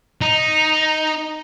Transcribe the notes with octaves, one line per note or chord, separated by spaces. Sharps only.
D#4